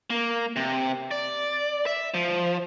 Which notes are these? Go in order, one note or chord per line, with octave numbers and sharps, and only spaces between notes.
A#3
C3
D5
E5
F3